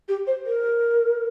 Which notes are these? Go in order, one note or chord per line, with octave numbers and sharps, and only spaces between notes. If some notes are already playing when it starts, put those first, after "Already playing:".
G4
C5
A#4